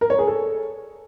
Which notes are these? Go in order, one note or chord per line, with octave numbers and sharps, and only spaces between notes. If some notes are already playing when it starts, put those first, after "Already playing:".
A#4
C#5
G#4
A4